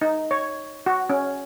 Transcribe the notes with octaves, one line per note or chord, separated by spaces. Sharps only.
D#4
C#5
F#4
C#4